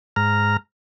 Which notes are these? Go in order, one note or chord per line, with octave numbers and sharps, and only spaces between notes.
G#2 A#5 F6